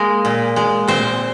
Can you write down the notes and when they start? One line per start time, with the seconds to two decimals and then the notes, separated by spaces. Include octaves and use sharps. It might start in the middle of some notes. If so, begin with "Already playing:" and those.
Already playing: G#3 A#3 A#4
0.25 A#2
0.56 G#3
0.88 A#2 C4 C5